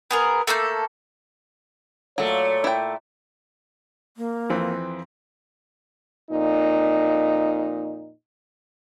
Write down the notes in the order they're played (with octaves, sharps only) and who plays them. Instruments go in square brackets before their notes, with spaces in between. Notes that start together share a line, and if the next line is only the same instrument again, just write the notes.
[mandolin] B3 G#4 A#4
A3 A#3 A4 G6
[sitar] A#2 A3 [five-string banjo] F#3 [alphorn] C#5
[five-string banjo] E4 G5
[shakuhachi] A#3
[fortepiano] F2 E3 C4
[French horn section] F2 A#2 D#4